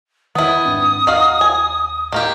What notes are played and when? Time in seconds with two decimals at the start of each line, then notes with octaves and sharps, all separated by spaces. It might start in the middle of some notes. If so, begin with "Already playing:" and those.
0.35 E2 D#3 B3 E4 D#6
0.65 G#2 C4 D4
1.07 D#2 D#4 F#4 F5
1.41 G#5
2.12 A2 D#3 A#3 G4